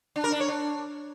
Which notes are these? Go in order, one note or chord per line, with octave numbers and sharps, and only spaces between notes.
D4
A#4
D4
C#5
D4